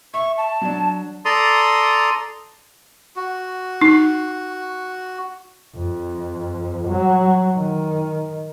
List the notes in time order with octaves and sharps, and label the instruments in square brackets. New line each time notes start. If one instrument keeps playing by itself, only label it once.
[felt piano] E5 [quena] C#6
[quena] A5
[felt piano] F#3 D4
[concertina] A4 D5 A#5 C6 D#6
[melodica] F#4
[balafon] D#4
[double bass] F2
F#3
D#3